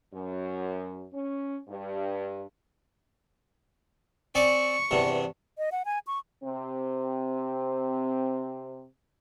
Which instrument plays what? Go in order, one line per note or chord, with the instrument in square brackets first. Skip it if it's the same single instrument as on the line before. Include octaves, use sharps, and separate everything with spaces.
[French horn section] F#2
C#4
G2
[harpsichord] C4 D5 G#5 [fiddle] C#6
[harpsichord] E2 G2 C3
[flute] D#5
F#5
G#5
C#6
[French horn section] C3 C4